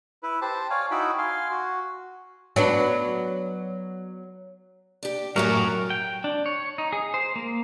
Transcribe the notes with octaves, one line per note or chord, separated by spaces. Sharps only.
E4 B4
G4 C5 A5
C#5 D5 F5 G#5
D#4 E4 F#4 G5 B5
F5 G#5 C6
F#4
F#3 B3 D4
D4 G4
F#2 A2 F#3 A3 F#4 G4 A#4
G5
D4
C#5
D#4
G#4
C5
A#3